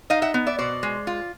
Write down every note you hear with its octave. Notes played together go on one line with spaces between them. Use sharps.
D#4 D#5 F5
E5 F#5
B3
D5 E5
B2 C5 D5
G#3
F4